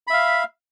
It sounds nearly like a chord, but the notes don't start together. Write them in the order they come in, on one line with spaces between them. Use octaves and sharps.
B5 E5 F5